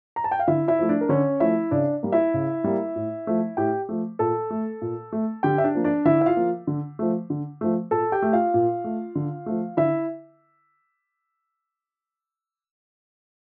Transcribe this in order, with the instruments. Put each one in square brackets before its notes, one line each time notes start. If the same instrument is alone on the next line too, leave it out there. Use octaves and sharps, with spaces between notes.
[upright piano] A#5
A5
G5
F5
D3 E4 E5
E4 E5
F3 A3
D4 D5
A#4
D3 C#4 C#5
F3 A3 E4 E5
C#3 D4 D5
G3 A#3
E4 E5
C#3
G3 A#3
A2
F3 A3
A2 G4 G5
F3 A3
A#2 A4 A5
A3
A#2
A3
D3 G4 G5
E5
D4 D5
F3 A#3
D4 D5
D3 E4 E5
E5
F4 F5
F3 A#3
D3
F3 A3
D3
F3 A3
A#2 A4 A5
G4 G5
A3
F4 F5
A#2
A3
D3
F3 A3
D3 E4 E5